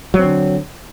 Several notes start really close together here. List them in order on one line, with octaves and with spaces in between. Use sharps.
F#3 C4 D3